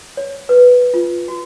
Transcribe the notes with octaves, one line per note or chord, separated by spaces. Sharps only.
C#5
B4
F4
F#4